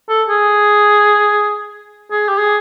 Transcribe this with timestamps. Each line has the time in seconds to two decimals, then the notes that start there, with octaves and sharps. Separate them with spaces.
0.09 A4
0.29 G#4
2.11 G#4
2.29 G4
2.38 G#4